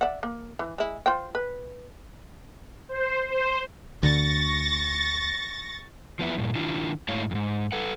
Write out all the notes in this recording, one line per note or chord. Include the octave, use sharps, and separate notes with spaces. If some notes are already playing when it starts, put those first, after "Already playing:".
D5 E5 F#5
A#3
E3
G#3 E4
F4 C5 G5
B4
C5
C5
D2 D3 C#6 A6 A#6
F3 B3 E4
G2 A#2
D#3 D4 E4 F4
G#2 A3 E4 C#5 F5
F2 G#2
A4 B4 F#5